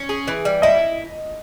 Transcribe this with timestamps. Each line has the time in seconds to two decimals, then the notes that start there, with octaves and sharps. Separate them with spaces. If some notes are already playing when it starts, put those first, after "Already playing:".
Already playing: C#4
0.09 G#4
0.28 E3
0.45 G3
0.62 E4 D#5